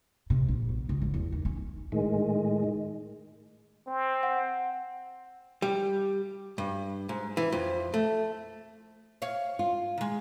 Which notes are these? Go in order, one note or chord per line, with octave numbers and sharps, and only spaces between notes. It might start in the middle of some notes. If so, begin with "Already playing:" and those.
C3
A#1
B3
C#2
G#1
E2
D#2
C#4
A2 D#3 G#3
C4
F#5
G3
G2
G#2
E3
F2
A3
C#5 F5
F4
D#3 G#3